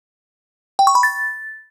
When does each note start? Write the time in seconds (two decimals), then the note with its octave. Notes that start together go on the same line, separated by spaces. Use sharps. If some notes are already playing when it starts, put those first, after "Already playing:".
0.79 G5
0.87 C#6
0.95 B5
1.03 A6